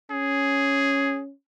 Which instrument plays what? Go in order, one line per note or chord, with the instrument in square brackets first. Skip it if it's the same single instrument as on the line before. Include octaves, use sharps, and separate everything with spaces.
[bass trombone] C#4 [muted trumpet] G#4